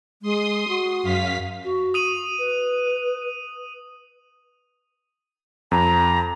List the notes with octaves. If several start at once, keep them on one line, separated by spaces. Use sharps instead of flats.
G#3 C6 D#6
F#4
F#2 F5 B6
F#4
D#6 D#7 F#7
B4
F2 A#5